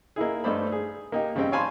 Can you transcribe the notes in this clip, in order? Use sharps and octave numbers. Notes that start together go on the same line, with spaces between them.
A#3 D#4 E4 G#4
G2 A3 D#4 C5 D5 B5
G#4
A#3 D#4 G4
C#3 G3 C4 D#5 G5
C#5 F5 G#5 A5 B5 C6